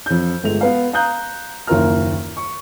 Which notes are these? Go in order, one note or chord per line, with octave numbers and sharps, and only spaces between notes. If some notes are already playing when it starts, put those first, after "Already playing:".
F2 G6
G1 G#3 A3 F7
B3 B4 F5
F5 A#5 D#6 F#6 G6
F#1 D#2 F4 A#4 A#5 F6
C#6